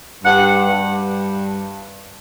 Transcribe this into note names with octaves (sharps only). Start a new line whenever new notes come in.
G2 F#5
G2